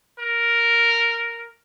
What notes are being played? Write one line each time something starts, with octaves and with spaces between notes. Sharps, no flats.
A#4